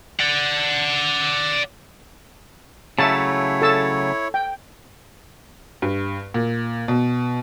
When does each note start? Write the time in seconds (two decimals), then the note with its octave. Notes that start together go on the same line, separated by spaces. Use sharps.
0.20 D5 F#5
2.99 C#3 F#3 A3 E4 C#5 E5 A5
3.62 A4 A5 E6
4.34 G5
5.82 G2
6.34 A#2
6.88 B2